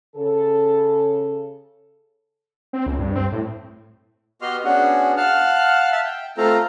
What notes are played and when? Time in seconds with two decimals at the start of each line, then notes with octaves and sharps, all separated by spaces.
0.16 C#3 A4
2.73 C4
2.86 C#2
2.99 G2
3.15 C4
3.32 A2
4.41 B3 F#4 G4 D#5 C6 F6
4.64 B3 C#4 D4 F#4 G#4 F#5
5.17 F5 F#5 A5 F6 F#6
5.92 E5 A5
6.05 G5
6.38 A3 C4 F4 A4 A#5